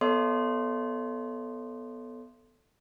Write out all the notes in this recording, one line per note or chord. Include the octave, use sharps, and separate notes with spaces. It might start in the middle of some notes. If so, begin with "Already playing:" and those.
B3 A4 C#5 D#5 C6